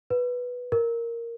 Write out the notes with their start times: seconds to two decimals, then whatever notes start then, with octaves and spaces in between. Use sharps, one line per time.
0.10 B4
0.72 A#4